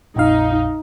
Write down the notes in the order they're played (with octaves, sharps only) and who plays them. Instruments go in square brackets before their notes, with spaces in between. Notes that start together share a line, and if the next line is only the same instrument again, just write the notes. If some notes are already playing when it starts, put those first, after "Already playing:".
[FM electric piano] A#1 F2 F5 [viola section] D#4